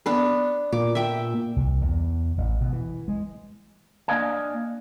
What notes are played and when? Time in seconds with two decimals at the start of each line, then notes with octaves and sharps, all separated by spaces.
0.06 B3 D4 B4
0.72 A#2 D6
0.95 E5 G5
1.56 C2
1.81 E2
2.38 A1
2.61 B2
2.73 E3
3.08 G#3
4.08 A#3 D4 D5 D#5 F5 G#5